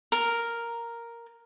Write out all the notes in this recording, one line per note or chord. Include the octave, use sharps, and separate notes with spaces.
A#4